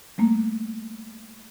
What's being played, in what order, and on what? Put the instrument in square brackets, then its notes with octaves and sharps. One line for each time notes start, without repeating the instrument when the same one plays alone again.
[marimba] G3 A3 A#3